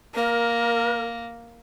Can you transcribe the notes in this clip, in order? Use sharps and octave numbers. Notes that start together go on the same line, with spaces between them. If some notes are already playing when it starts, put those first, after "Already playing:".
A#3 A#4